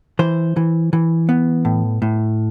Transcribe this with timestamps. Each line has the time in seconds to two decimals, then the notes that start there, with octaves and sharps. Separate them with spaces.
0.19 E3 C5
0.57 E3
0.93 E3
1.29 B3
1.65 A2
2.02 A2